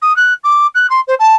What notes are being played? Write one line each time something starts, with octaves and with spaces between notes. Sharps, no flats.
D#6
F#6
D6
F#6
C6
C5
A5